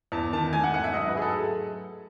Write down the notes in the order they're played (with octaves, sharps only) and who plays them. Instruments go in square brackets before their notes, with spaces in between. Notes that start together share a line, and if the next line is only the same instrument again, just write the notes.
[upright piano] E2 A5
D#3 A5
A3 G#5
F#5
G#2 F#5
E5
F#3 D#5
B4
F#3 G#4
A4